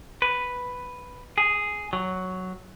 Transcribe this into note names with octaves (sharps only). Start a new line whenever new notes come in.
B4
G#4
F#3